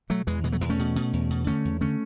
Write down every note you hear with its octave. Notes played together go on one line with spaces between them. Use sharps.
B2 F#3 A3
E2 E3 G#3
B2 E3 G#3
F#3 A3
E2 E3 G#3
A3 C#4
B2
B2
E2
B2
D3 A3 C#4
E2
D3 A3 C#4